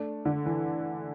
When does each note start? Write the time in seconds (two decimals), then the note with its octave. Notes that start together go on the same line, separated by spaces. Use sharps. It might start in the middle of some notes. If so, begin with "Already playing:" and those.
Already playing: A3 D4
0.25 D3
0.46 E3